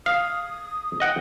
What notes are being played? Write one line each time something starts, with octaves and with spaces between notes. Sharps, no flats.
F5 D#6
D#5 F#5 G5